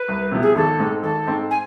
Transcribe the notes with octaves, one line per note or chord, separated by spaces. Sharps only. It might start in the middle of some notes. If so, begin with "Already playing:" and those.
Already playing: B4
C2
C3 F3 B3 E4
G#4
G#1 A4
G#2 G#3 C4
G#1 A4
G#2 G#3 C4
G#5